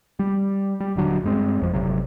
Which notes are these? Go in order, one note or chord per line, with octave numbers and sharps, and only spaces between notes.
G3
G3
D#1 D3 F#3 D4
G2 G#3 C4
G1 F2 F3
G1 D2 C3 F#3